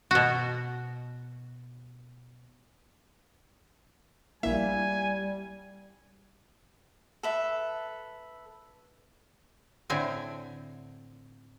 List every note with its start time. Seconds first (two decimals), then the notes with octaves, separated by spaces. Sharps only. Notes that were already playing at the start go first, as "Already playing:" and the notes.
0.11 B2 F#4
4.43 A#1 G3 A#3 E4 E5 G#5
7.23 A4 B4 E5
9.90 A2 D3 C4 G#5